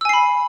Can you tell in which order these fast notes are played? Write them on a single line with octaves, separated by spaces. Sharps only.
E6 G#5 C7 B5